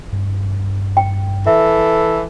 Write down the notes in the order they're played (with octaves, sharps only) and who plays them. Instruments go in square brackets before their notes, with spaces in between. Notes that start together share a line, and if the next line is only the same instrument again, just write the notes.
[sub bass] G2
[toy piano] G5
[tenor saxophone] E3 [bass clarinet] A4 [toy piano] E5